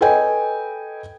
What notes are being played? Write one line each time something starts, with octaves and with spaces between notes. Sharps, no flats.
A4 B4 C#5 D#5 G5 G#5